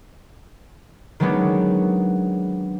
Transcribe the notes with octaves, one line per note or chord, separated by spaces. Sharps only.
D#3 F#3 G#3 B3 C#4 D4